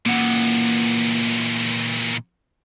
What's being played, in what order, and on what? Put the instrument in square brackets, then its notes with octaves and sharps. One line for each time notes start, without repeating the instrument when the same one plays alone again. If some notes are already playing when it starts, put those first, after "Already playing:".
[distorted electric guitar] A#2 E3 [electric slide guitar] A#3 F#5